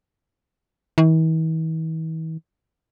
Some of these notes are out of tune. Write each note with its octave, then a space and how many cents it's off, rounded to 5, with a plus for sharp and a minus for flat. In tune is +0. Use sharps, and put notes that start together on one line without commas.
E3 -45